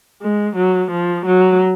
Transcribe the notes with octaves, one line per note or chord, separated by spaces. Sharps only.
G#3
F#3
F3
F#3